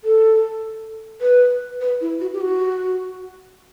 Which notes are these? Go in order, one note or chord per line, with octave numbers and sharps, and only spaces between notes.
A4
B4
B4
E4
F#4
G4
F#4